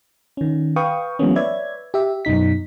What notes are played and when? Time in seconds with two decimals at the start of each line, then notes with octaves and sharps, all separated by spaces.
0.37 D#3 C#4
0.76 B4 F5 G5 C#6 D#6
1.19 E3 F#3 G#3 A#3 B3 C#4
1.36 B4 C#5 D5 E5 G#6
1.94 G4 E5
2.25 F#2 B2 D#4 B6